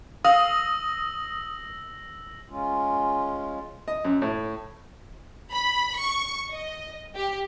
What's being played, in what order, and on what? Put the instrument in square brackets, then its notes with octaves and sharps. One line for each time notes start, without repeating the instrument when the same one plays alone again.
[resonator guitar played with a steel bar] F5 [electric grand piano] D#6 [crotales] E6 A#6 F#7
[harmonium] G#3 C#4 F4
[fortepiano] D#5
F#2
A2
[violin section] B5
C#6
D#5
G4